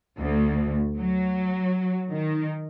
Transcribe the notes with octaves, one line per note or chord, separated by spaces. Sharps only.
D2
F#3
D#3